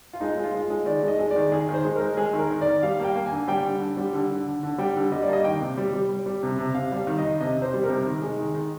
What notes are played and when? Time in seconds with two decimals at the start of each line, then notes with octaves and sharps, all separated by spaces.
0.13 F4
0.20 G#3 D#4
0.38 G#3
0.43 F4
0.54 G#3
0.70 G#3
0.86 D#3 D5
1.03 G#3 D#5
1.19 G#3
1.31 D5
1.36 D#3
1.52 D#3 G#4
1.69 D#3
1.74 C5
1.85 G#3
1.96 A#4
2.01 G#3
2.17 G#3 G#4
2.33 D#3
2.39 A#4
2.50 D#3
2.61 D5
2.67 D#3
2.83 G3 F5
3.00 A#3 G5
3.16 A#3
3.26 G#5
3.32 D3
3.48 G3 G5
3.64 D3
3.80 D3
3.97 G3
4.13 D3
4.30 D3
4.46 D3
4.63 D3
4.78 G3 G5
4.96 D3
5.12 G3 D#5
5.22 D5
5.28 A#3 D#5
5.44 D#3 G5
5.60 C3
5.77 G3
5.93 G3
6.09 G3
6.26 G3
6.43 C3
6.59 C3
6.74 C3 F5
6.92 G3 F5
7.07 D#3
7.18 D#5
7.24 D#3
7.40 C3 D#5
7.57 C3 C5
7.74 G3
7.84 A#4
7.89 C3
8.06 D#3
8.22 G#3
8.39 D#3
8.55 D#3